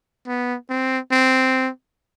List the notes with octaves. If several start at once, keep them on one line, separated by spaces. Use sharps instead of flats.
B3
C4
C4